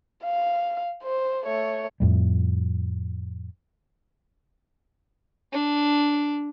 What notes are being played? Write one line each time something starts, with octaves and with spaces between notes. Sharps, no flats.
F5
C5
A3 C#5
F2 A2 G3
D4